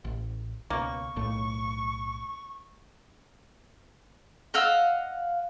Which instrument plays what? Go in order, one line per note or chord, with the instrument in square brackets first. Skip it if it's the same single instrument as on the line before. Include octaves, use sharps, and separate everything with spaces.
[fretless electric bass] A1
[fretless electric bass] C#2 B2 [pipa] A#3 [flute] C#6
[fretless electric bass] B1 A2 A3
[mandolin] D#5 F5 F#5 E6